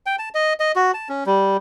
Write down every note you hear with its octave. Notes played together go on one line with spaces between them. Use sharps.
G5
A5
D#5
D#5
F#4
A5
C#4
G3